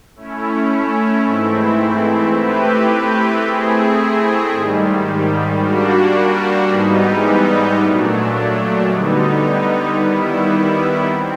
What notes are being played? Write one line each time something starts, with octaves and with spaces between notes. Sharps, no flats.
A3 C#4 E4
G#2 E3 A3 C4 E4
A3 C4 E4 G4 B4
A3 C4 E4 G#4
G#2 D#3 G3
G3 A#3 D4 F#4
G#2 E3 G3 B3 D#4
A#2 F#3 A3 D4
D3 G3 B3 D#4
D#3 G3 B3 E4
C4